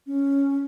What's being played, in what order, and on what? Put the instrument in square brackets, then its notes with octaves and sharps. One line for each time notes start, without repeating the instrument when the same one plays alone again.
[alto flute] C#4